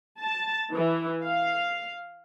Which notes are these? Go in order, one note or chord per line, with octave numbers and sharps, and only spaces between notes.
A5
E3
F5